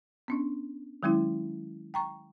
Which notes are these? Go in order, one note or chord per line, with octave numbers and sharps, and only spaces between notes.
B3 C#4 D4
D#3 F#3 G#3 C#4 E4
G5 A#5 C#6